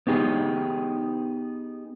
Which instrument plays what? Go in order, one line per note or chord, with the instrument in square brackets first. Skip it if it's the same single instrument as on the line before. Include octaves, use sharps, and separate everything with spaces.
[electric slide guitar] B3 D#4 G4 G#4